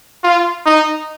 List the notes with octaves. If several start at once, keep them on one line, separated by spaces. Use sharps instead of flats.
F4
D#4